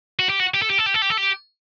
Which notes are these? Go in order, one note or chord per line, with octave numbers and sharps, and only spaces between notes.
F#4
G4
F#4
G4
A4
G4
A4
G4
A4
G4
A4
G4